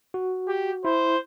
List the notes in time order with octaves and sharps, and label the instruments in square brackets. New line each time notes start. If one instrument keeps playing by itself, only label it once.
[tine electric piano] F#4
[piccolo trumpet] G4
[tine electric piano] E4 [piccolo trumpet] C5